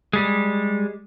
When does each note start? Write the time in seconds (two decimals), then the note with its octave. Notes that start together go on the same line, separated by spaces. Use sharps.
0.13 G3 G#3